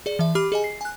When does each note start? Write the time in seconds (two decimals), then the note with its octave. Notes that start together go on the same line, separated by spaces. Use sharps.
0.06 G#4 D5
0.19 E3 E5
0.35 G4 B5 D6 F6
0.52 G#4 D#5 G#5
0.64 C7
0.81 G#5 F#6